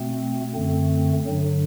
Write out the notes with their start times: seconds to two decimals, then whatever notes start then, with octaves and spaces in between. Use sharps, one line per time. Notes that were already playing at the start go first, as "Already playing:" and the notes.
Already playing: B2 A3 C4
0.54 F#2 D3 A3 C4
1.27 G2 D3 F#3